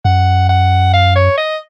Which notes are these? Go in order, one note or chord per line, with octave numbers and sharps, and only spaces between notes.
F#2 F#5
F#5
F5
C#5
D#5